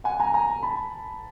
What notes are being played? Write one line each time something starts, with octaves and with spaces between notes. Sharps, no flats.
F#5 G#5
G#5 A#5
G#5 A#5
A5 B5